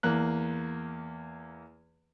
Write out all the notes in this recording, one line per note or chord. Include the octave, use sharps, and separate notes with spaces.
E2 A#3 F#6